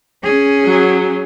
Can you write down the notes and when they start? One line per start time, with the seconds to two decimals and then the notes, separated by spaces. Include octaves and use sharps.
0.24 C#4 G#4
0.64 F#3